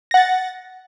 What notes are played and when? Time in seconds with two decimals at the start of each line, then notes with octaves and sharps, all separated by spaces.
0.11 A#6
0.14 F#5
0.17 A6